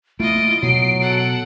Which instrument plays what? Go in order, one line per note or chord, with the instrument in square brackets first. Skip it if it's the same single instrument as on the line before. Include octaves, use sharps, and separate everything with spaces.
[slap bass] A3 A#3 [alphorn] E4 [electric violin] F4 D#5 [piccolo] D7
[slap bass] B2 [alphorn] F#3 [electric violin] C7
[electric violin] A4 F#5